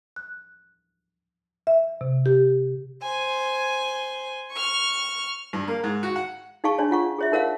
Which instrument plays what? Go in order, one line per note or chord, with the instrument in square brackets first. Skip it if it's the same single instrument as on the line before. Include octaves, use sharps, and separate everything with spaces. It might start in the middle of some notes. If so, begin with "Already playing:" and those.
[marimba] F#6
E5
C3
G4
[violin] C5 G#5
C#6 F6
[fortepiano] G2
A#3
G#2
F#4
F#5
[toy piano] D#4 G#4 F5 A5 C#6
D4 C#5
F4 F#5 C#6
G#4 C#5 E5
D#4 A#4 C#5 F5 F#5